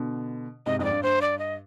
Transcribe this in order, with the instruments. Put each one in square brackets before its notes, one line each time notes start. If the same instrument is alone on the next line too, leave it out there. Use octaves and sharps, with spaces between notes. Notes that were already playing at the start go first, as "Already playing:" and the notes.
Already playing: [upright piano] B2 D3
[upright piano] G#2 C3 [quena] D#5
[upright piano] F2 G#2 [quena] D#5
[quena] D5
[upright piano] G2
[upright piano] G2 [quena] C5
[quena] D5
D#5